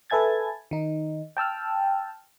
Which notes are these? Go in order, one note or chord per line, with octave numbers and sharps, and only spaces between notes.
A4 B4 E5 G#5 G#6 A6
D#3 D#4
G5 A5 E6 F6